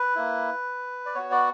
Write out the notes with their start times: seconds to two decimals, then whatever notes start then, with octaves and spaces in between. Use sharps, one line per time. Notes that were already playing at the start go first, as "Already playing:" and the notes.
Already playing: B4
0.16 A#3 E4
1.06 D5
1.15 B3 F#4 C#5
1.31 D5